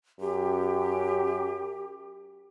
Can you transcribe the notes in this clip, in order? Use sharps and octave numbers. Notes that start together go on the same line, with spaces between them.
F#2 G4